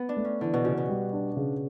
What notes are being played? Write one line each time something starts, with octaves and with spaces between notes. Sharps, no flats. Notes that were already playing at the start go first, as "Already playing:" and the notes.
Already playing: B3
D4
A3
C#4
D3 E3
B2
C#3 F#4
B2
G3
D4
C#3